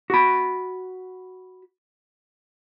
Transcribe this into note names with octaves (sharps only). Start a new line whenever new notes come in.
F#4 B5